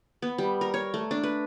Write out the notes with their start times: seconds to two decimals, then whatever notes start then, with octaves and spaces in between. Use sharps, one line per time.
0.22 B3
0.38 G3
0.61 A#4
0.74 C#5
0.94 A3
1.11 D4
1.23 B4